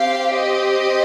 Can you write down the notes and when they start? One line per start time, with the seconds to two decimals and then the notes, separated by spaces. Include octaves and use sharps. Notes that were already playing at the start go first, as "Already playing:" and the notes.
Already playing: C4 G4 F5
0.35 D#5